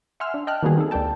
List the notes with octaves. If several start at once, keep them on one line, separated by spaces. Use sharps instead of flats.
E5 F#5 G#5 C6 E6 F6
D4
D#5 G5 A5 F6 F#6
D#3 G3 A#3 B3 F#4 G#4
C4 D#4 G#4 A4
D2 G#3 A#3 D5 G5 A5